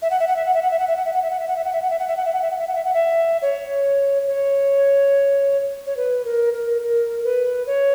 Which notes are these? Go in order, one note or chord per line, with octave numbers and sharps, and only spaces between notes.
E5
F#5
E5
F#5
E5
F#5
E5
F#5
E5
F#5
E5
F#5
E5
F#5
E5
F#5
E5
F#5
E5
F#5
E5
F#5
E5
F#5
E5
F#5
E5
F#5
E5
F#5
E5
F#5
E5
F#5
E5
C#5
C#5
C#5
B4
A#4
A#4
A#4
B4
C#5